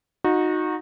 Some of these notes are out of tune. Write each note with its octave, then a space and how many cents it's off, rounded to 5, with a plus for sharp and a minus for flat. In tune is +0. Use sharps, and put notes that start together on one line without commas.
D#4 +0 F#4 -25